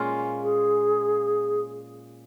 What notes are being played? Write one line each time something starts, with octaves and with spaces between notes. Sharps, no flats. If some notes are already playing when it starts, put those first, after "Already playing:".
Already playing: A#2 G#3 C#4 F4
G#4